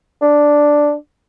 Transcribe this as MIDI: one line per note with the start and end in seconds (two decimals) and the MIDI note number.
0.22 0.94 62